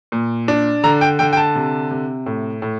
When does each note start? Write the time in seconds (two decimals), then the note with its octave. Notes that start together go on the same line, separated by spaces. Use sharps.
0.12 A#2
0.48 D4
0.83 D3 A#5
1.01 G5
1.19 D3 G5
1.33 G5
1.37 A5
1.55 C3
1.91 C3
2.26 A2
2.62 A2